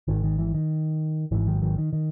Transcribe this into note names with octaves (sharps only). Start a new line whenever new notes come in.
G#1 G#2 D#3
D#3
E3
D#3
G#1 G#2 E3
D#3 F#3
D#3 F#3
D#3
D#3